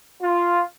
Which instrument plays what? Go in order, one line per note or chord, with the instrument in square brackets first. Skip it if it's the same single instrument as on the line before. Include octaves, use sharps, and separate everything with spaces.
[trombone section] F4